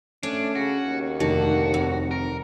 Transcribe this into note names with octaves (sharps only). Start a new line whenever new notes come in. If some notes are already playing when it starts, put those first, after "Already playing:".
A3 C#4 D4
C#3 F#4
D#2
F1 D3 D#3 F#4
F2
A#4